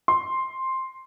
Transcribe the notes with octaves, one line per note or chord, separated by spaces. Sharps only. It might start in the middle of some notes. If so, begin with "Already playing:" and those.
C6